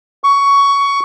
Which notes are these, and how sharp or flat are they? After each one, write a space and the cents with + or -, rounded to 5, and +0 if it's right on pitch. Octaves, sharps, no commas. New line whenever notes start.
C#6 +15